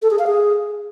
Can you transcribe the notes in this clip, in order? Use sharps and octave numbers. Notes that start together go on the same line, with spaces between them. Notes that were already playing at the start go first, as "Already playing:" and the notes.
A4
G#4
F5
G#4